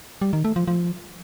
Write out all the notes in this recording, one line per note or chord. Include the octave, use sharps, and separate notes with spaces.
G3
D#3
A3
F3
F3